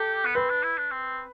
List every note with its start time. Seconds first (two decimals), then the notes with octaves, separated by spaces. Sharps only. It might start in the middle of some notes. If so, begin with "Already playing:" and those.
Already playing: G4 A4
0.25 B3
0.35 C4 B4
0.50 D4
0.63 E4
0.77 D4
0.91 C4